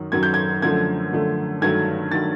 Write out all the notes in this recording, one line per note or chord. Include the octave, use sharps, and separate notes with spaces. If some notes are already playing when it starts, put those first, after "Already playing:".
Already playing: F#2 D#3 F#3
F#2 D#3 F#3 G#6
G6
G#6
F#2 D3 F3 A3 G#6
F#2 D3 F3 A3
G2 D#3 F#3 A3 G#6
D#3 F#3 A3 A6